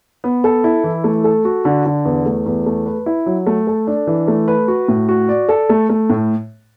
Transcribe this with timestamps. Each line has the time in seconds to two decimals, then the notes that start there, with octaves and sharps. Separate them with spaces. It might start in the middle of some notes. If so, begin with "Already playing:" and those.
0.24 B3
0.44 A4
0.64 E4
0.84 E3
1.04 A3
1.24 A4
1.45 F#4
1.65 D3
1.85 D3
2.05 E2
2.26 A3
2.46 E2
2.66 A3
2.86 B4
3.06 E4
3.26 F#3
3.47 A3
3.67 A4
3.87 D4
4.07 E3
4.28 A3
4.48 B4
4.68 F#4
4.88 A2
5.09 F#4
5.29 D5
5.49 A4
5.69 A3
5.90 A3
6.10 A2